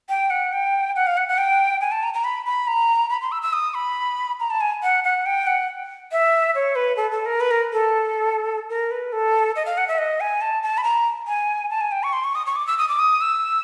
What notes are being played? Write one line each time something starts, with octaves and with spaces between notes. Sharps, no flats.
G5
F#5
G5
F#5
F5
F#5
F#5
G5
G#5
A5
A#5
A#5
B5
B5
A#5
B5
C6
E6
E6
D#6
B5
A#5
A5
G#5
F#5
F#5
G5
F#5
E5
C#5
B4
A4
A4
A#4
B4
A#4
A4
A#4
B4
A4
D#5
F5
F#5
E5
D#5
G#5
A5
A5
B5
A#5
G#5
A5
G#5
G5
C#6
C6
C#6
D#6
C#6
D6
E6
D#6
D6
D#6
E6